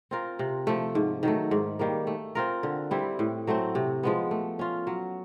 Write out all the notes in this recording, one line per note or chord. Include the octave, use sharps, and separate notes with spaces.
C4 F4 A#4
C3
F3 A3
G#2
D#3 F#3 A3
G#2
D#3 G3 A#3
A3
C4 F4 A#4
D3
G3 C4 E4
A2
F#3 A3 C4
C3
F3 G#3 B3
A3
C#4 F4
F#3